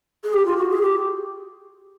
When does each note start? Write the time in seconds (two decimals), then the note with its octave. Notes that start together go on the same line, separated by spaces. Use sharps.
0.24 G#4
0.34 G4
0.46 F4
0.57 F#4
0.70 G#4
0.82 G4